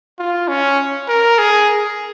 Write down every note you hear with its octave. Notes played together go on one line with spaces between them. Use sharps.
F4
C#4
A#4
G#4